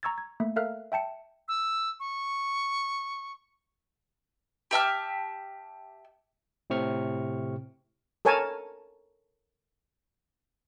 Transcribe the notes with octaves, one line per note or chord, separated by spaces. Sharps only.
A#5 C#6 E6 G#6 A6
G#6
A3 A#3 E5
A4 A#4 E5 F5 F6 F#6
E5 G5 A5 C#7
E6
C#6
G4 E5 A5 F6
A2 C3 C4 C#6 F6
A4 A#4 C#5 G#5 A5